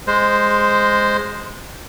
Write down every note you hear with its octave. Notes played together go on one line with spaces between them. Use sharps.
G#3 C5